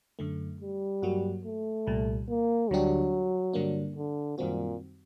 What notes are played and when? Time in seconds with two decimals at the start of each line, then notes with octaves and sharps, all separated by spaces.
0.19 F#2 D3 A3
0.61 G3
1.02 G2 F#3 A#3 F#4
1.44 A3
1.87 C2 A#2 G3
2.29 A#3
2.70 D2 D3 F#3 G3 D4 G4
3.53 G2 D3 G3 A#3 D4
3.96 D3
4.38 F#2 A#2 D#3 G3 C4 F#4